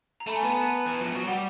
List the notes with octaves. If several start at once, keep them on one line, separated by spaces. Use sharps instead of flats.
A#5
A3 A5 B5
G#5 A#5
B3 A5 B5
G#5 A#5
A5 B5
E3
F3
F#3
G3 F#5